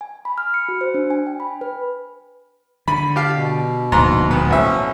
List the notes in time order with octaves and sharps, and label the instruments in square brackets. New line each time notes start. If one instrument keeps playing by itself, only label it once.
[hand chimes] G#5
B5
F6
C#7
F#4
C5
D4
G#5
G5
B5
B4
[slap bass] D3 [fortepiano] B5
[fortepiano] G4 F5 [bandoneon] A5
[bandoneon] B2
[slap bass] D1 A#1 [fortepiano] G#2 A#5 C6
[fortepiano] D2 B3
[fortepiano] B1 E5 [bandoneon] A2 F3 C#4